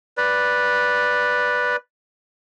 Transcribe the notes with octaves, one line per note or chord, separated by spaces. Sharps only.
B4 D5